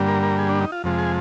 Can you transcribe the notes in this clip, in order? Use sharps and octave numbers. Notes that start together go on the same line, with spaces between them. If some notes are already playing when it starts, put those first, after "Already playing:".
Already playing: G2 D3 G3 A#3
A#4
A#4
G#4
D4
D#4
F4
F2 C3 F3 G#3
G#4